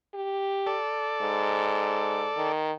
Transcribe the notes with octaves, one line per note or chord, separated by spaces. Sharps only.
G4
A4 D5
G#2
D#3